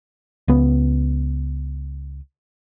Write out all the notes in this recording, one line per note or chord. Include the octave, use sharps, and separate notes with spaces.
C#2 B3